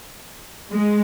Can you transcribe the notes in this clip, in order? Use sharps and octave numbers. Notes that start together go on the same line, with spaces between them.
G#3